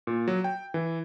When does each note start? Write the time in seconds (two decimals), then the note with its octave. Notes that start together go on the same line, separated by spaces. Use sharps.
0.07 A#2
0.28 F#3
0.44 G5
0.74 E3